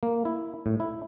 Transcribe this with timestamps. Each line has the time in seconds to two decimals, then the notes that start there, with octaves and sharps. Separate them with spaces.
0.03 A#3
0.25 E4
0.66 A2
0.80 E4